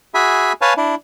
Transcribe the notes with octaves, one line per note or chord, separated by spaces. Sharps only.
F#4 G#4 E5 G#5 B5
B4 C#5 F5 G#5 A5
D4 E4